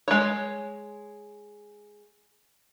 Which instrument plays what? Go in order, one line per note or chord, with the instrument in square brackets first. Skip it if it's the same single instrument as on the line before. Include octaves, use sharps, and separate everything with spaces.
[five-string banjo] G#3 C#5